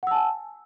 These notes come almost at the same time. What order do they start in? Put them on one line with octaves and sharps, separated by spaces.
F#5 E6 A5 G#5